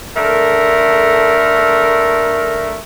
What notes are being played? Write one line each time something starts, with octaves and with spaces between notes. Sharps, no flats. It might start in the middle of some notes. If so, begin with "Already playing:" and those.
D3 A3 A#4